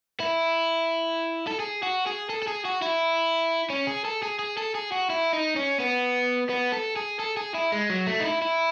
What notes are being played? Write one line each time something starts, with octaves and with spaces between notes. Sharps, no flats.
E4
A4
G#4
F#4
G#4
A4
A4
G#4
F#4
E4
C#4
G#4
A4
G#4
G#4
A4
G#4
F#4
E4
D#4
C#4
B3
B3
A4
G#4
A4
G#4
E4
G#3
F#3
A3
D#4
E4
E4